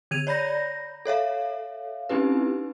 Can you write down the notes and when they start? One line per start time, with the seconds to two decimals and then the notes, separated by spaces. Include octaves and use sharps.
0.11 D3 G#6 D#7 F7
0.27 C#5 D5 A#5 B5 G6 A#6
1.05 A4 C#5 E5 F5
2.09 C4 C#4 D#4 E4 G4 B4